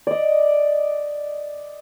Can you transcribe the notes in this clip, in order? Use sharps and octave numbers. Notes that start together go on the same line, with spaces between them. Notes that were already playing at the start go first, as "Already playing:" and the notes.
D5 D#5